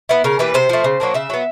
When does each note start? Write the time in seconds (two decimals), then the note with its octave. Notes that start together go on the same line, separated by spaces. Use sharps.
0.09 B3 E4
0.24 C#3 A#4
0.39 E3 G3 A#3 B4
0.54 C3 C5
0.69 F3 A3
0.84 C#3
1.00 F#3 A#3 D4
1.14 C#3 E5
1.30 F#3 B3